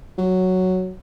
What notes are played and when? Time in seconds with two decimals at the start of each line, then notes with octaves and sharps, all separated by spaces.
0.18 F#3